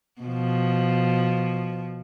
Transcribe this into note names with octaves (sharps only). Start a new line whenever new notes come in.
B2 F3